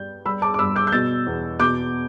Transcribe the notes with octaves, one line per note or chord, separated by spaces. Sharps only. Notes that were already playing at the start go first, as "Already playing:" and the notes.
Already playing: G2 G3 G6
G3 B5 E6
A5 D6
D6
G2 B5 E6
D6 G6
G6
B2 E6 A6
E2
B2 D6 G6